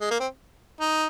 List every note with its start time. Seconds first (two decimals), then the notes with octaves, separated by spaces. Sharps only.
0.01 G#3
0.11 A#3
0.20 C4
0.80 D#4